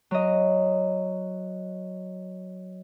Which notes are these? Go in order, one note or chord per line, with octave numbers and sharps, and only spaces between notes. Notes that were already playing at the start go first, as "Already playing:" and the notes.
F#3 D#5